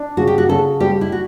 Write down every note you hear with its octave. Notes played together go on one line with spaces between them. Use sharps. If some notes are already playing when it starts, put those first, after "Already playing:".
Already playing: D4
C#3 F#4
G4
F#4
C#3 A4
G3 G4
E4
F#4